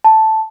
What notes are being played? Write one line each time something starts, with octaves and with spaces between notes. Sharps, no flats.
A5